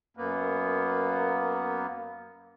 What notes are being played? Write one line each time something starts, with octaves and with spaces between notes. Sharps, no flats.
F#2 A#3 B3